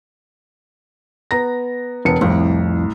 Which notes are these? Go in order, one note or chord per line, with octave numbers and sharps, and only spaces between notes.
B3 A#5 A#6
E1 B3 C#7
C2 F2 A2